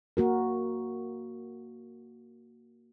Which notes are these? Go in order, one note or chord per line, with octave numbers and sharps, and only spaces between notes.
A#3 F#4 A#4